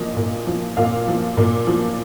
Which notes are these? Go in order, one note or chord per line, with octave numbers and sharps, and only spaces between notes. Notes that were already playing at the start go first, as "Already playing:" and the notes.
Already playing: A#2 F3 D#5
A#2
F3
A#2 F5
F3
A#2
F3